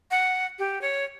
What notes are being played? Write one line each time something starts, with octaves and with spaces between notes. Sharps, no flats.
F#5
G4
C#5